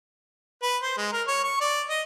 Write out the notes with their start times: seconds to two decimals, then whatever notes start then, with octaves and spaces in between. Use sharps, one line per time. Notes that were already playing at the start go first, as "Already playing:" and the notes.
0.62 B4
0.82 C5
0.97 G#3
1.12 A#4
1.28 C#5
1.44 C#6
1.61 D5
1.90 D#5